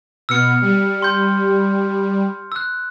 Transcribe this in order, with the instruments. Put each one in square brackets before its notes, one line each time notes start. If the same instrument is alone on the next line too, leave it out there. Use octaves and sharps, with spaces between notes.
[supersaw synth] B2 B3 [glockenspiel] E6 F6 C#7
[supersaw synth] G3
[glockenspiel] C6 G6
E6 F#6